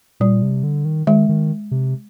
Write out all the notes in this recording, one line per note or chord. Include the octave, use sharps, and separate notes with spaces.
A#2 G3
C3
D3
D#3
D#3 G#3
D#3
C3